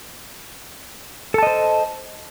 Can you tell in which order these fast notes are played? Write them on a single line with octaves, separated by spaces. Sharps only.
A4 A5 D#5 C5